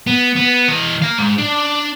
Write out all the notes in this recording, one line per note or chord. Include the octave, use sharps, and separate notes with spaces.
B3
B3
E3 D#5
F5 A#5
G#2
D4